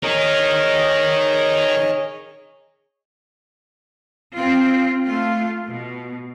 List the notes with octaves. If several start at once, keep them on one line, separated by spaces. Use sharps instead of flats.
D#4 G#4 A#4 C#5 D#5
C4 F4
A3 F4
B2